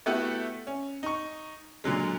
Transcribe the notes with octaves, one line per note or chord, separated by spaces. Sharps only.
A3 B3 E4 F#4 G4 A4
C#4
D#4 C#6
A#2 D3 F#3 G#3